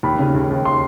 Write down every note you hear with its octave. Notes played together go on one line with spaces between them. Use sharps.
D#2 B5
C#3
D#2
D#2
C6